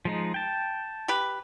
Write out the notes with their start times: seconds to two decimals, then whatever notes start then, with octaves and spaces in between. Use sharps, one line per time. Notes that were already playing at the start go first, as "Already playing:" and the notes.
0.05 F3 G#3 D#4
0.34 G5 A5
1.08 G4 B4